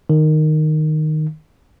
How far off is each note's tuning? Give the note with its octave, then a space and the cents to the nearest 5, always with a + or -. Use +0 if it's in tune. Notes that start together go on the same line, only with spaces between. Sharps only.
D#3 -10